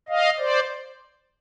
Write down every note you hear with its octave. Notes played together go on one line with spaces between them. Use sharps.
D#5 F5
C5 D5